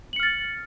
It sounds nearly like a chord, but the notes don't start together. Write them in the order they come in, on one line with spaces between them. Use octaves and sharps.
F#7 C#7 F6 A6